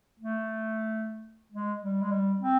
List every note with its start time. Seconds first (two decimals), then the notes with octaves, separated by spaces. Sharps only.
0.20 A3
1.52 G#3
1.81 G3
2.02 G#3
2.11 G3
2.40 C4